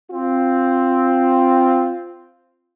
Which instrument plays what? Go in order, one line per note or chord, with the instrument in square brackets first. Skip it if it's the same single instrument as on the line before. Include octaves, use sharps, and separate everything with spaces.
[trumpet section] C4 [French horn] F4